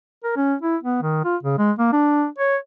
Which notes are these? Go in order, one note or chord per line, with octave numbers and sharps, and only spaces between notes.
A#4
C#4
E4
B3
D#3
F4
C#3
G#3
A#3
D4
C#5